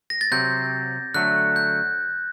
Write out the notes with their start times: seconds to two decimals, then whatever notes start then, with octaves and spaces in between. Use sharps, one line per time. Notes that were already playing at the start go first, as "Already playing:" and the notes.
0.10 A#6
0.21 A6
0.32 C3 F#3 C4 G6
1.14 D3 F#3 A3 F#6
1.56 G6